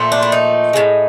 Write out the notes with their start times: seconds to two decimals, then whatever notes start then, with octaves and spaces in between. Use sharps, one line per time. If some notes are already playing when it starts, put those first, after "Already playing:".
Already playing: A#2 F3 A3
0.12 D4
0.23 E4
0.32 D#4
0.73 A2 F3 G#3